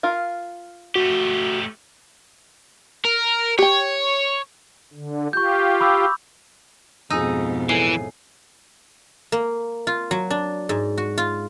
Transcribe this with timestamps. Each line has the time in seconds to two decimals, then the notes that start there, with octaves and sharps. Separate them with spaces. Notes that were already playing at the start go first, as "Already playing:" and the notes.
0.03 F4 A#4 F5
0.96 A3 F#4 G4
3.05 A#4
3.59 G4 C#5 G5
4.93 D3
5.33 F4 G4 C#6 G6
5.80 B5 D6 E6
7.10 F2 G#2 B2 D#4 G#4 G#5 E6
7.69 A2 E3 A4 G#5 C7
9.32 A#3
9.87 F4
10.11 F#3
10.30 D4
10.69 G#2
10.98 F#4
11.18 F4